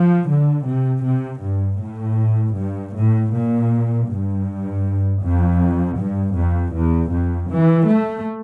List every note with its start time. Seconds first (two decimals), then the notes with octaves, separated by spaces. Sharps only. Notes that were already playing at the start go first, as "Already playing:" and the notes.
Already playing: F3
0.29 D3
0.67 C3
1.05 C3
1.42 G2
1.81 A2
2.57 G2
2.96 A2
3.34 A#2
4.09 G2
5.24 F2
5.99 G2
6.38 F2
6.75 E2
7.13 F2
7.51 E3
7.89 A3